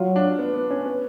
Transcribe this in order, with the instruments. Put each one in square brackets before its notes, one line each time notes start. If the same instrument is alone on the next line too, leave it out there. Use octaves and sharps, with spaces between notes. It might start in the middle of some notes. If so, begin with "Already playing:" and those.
Already playing: [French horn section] F#3 [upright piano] F4
[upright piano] D4
B3
B3
C#4
B3